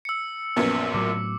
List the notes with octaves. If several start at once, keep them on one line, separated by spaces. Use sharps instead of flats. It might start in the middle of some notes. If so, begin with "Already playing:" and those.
E6 C#7
A#1 F#2 A#2 B3 C#4 B4
A2 F#3 D6